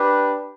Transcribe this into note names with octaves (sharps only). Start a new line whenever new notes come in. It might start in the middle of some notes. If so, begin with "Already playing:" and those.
Already playing: D4 G4 B4